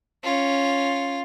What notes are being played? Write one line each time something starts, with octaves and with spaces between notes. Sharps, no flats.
C#4 F4